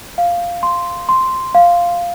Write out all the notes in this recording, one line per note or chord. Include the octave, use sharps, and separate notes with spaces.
F5
C6
C6
F5